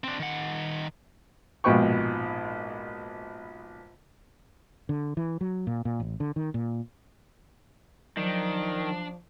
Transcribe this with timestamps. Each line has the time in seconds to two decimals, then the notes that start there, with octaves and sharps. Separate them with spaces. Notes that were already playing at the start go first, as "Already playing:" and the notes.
0.04 C4 D4
0.19 D#3 F#5
1.64 A#1 G#2 B2 B4 G5 C#6
4.89 D3
5.17 E3
5.41 F#3
5.67 A#2
5.85 A#2
6.00 A1
6.20 D3
6.36 D#3
6.54 A#2
8.17 D#3 F3 F#3 D4